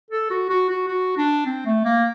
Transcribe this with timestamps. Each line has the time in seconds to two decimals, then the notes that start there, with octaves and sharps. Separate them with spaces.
0.11 A4
0.30 F#4
0.49 F#4
0.69 F#4
0.88 F#4
1.17 D4
1.46 C4
1.66 A3
1.85 A#3